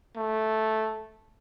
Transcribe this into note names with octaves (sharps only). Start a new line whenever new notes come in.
A3